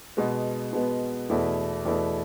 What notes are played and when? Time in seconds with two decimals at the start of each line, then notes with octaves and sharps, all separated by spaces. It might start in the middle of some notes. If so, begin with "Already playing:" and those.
0.17 B2 G#3 B3
0.73 B2 G#3 B3
1.30 E2 B2 A3 E4
1.85 E2 B2 A3 E4